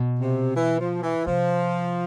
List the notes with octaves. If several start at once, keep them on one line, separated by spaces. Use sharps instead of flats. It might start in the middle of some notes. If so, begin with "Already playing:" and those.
Already playing: B2
C3
E3
F3
E3
C3 F3